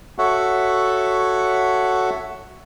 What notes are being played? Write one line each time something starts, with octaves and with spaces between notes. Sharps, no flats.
F#4 A4 C#5 E5 F#5